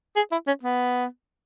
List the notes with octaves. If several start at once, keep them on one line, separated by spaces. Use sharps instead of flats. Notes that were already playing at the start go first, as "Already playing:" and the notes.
G#4
E4
C#4
B3